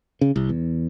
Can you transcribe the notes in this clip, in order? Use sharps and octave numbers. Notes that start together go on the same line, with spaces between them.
C#3
C2
E2